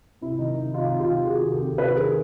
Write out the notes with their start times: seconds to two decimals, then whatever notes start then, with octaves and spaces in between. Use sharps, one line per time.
0.21 C3 E4
0.39 D#3 D#4
0.57 D#3
0.74 C3 D#4 F4
0.92 C3
1.00 F4 G4
1.09 D#3
1.26 D#3 F#4 G#4
1.44 C3
1.53 G4 A4
1.62 C3
1.78 D#3 A4 B4
1.96 D#3 G#4 A#4